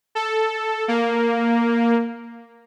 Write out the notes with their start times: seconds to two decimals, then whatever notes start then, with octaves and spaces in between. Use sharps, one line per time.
0.15 A4
0.88 A#3